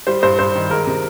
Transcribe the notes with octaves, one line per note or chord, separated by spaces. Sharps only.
G3 C5
G2 C5
G2 C5
D#3
G#3 A#4
C3